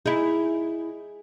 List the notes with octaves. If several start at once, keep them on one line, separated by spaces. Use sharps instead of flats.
D#4 E4 G#4